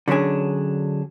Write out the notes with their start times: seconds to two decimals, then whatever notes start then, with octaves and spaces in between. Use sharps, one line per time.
0.08 D3 F#3 C#4 D4 G#4